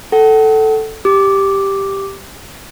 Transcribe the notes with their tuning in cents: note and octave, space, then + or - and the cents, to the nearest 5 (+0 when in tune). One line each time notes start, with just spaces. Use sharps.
A4 +0 F#5 +35
G4 +0 D6 +0